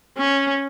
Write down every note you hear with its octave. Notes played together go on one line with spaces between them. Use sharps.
C#4